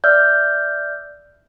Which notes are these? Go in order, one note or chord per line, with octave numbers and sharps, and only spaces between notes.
D5 E5 E6 F6 G6